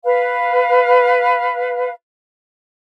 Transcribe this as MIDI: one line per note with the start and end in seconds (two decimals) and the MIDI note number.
0.04 1.92 71
0.04 1.92 77